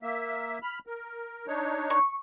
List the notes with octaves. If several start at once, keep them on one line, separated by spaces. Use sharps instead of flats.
A#3 E5
B5 F6
A#4
D4 D#4 C#5
C#6